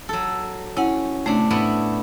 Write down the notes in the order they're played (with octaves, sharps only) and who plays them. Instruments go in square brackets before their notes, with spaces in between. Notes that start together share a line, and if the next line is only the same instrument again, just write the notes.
[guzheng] F#3 A4
[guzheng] C#4 [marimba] E4 F#5
[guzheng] C3 D4 [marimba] A3
[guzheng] A2 B3 E4